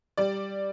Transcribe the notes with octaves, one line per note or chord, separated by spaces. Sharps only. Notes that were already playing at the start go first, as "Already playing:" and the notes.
G3 D5